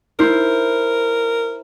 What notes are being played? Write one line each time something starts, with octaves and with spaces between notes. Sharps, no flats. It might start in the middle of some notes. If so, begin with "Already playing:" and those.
E4 A#4 C5